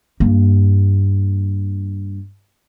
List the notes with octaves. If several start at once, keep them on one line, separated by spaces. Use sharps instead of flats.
G2 A#3